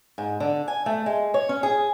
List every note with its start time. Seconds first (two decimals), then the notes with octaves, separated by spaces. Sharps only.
0.18 G#2
0.40 D3
0.68 G#5
0.86 A3
1.06 G#3
1.34 C#5
1.49 C#4
1.63 G#4